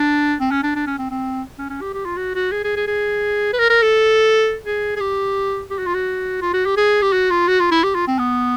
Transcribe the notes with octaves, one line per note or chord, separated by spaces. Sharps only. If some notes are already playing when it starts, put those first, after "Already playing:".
Already playing: D4
C4
C#4
D4
D4
C#4
C4
C4
C#4
C#4
G4
G4
F4
F#4
F#4
G#4
G#4
G#4
G#4
B4
A#4
A#4
A4
G#4
G#4
G4
G4
F#4
F4
F#4
F4
F#4
G4
G#4
G4
F#4
F4
F#4
F4
E4
G4
F4
C4
B3